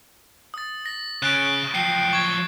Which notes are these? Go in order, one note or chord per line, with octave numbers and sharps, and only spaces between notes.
D#6 A6
A#6
C#3 C#4 F#6 A6 D7
F3 F#3 G5 C7
C#6 G#6